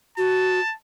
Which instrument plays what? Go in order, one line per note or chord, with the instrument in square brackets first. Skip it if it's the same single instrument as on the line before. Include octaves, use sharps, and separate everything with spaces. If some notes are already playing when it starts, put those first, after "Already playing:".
[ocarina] F#4 [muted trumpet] A5